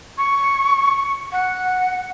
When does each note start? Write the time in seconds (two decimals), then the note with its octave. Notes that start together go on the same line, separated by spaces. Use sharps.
0.18 C#6
1.32 F#5